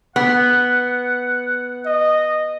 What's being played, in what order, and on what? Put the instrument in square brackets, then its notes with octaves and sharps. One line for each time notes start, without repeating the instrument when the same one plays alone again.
[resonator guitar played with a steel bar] B3 [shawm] F#5
[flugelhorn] D#5